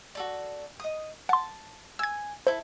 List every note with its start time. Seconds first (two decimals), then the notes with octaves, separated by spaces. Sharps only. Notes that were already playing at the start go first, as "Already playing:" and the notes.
0.15 F#4 A4 D5
0.80 D#5 D#6
1.29 F#5 A5 C6
1.99 G#5 E6 G#6
2.47 E4 A4 C5